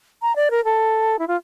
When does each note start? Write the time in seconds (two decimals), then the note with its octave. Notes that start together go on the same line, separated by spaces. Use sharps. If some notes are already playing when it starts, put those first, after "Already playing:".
0.22 A#5
0.36 D5
0.51 A#4
0.64 A4
1.19 E4
1.28 F4